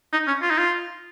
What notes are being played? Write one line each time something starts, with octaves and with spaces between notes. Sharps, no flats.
D#4
C#4
F4
D#4
F4